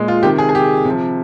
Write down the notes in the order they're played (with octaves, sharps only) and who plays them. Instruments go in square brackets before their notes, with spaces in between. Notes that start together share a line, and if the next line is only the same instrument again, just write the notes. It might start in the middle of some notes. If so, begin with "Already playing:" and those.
Already playing: [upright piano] A#2 G#3
F4
C3 D#3 G4
G#4
G#4
G4
C3 F3